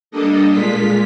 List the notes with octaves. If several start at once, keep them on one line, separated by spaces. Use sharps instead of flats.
G3 A#3 D4 A4 D#5
A#2 G#3 F4 B6